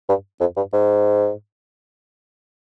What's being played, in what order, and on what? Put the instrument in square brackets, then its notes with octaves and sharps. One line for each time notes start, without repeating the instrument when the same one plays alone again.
[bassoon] G2
F2
G2
G#2